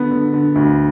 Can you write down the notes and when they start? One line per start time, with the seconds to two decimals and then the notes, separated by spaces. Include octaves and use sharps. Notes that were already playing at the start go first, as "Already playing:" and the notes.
Already playing: D3 B3
0.11 D3
0.33 D3
0.55 D2